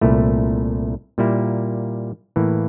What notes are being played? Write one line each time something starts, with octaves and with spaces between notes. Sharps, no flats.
C2 A#2 A3 E4
A#2 G3 A#3 E4
A2 E3 A#3